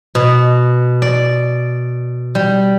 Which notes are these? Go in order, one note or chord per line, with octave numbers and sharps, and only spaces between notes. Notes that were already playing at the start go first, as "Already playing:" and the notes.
B2
D5
G3